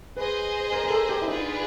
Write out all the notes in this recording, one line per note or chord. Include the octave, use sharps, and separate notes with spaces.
G#4 B4 C5 D#5
A#4
A#4
A4
G4
E4
B3 D4 D#4 F4 G#4 B4